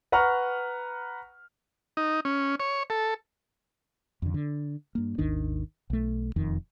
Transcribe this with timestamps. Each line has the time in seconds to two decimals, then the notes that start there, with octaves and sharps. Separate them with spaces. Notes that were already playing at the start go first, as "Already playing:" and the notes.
0.12 B4 F#5 A#5 C#6 F6
1.97 D#4
2.25 C#4
2.60 C#5
2.90 A4
4.22 F2 D3
4.34 D3
4.95 G2 A#3
5.18 G#1 D#2 D#3 D4
5.90 B1 A3
6.36 E1 F2 D#3